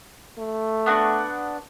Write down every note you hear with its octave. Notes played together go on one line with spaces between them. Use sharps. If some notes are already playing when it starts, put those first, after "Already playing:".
A3
B3 D4 F#4